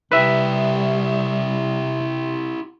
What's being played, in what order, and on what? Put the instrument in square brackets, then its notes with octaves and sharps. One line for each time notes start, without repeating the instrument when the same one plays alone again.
[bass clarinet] C3 [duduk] G3 [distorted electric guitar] E4 G4 [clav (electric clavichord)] B4 E5